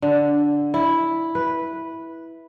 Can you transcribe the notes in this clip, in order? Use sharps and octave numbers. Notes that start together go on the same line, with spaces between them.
D3
E4
B4